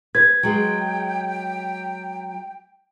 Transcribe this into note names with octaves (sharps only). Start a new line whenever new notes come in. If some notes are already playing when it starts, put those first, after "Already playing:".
B4 G#6
F#3 G#3 G5